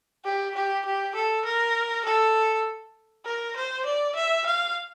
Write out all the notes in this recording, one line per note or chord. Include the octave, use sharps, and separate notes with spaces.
G4
G4
G4
A4
A#4
A4
A#4
C5
D5
E5
F5